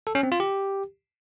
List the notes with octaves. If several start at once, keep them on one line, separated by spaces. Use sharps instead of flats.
A4
C#4
C4
F4
G4